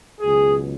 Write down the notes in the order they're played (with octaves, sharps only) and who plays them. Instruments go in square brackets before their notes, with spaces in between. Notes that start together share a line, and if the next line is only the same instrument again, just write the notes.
[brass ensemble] C#2 B2 F#3 G#4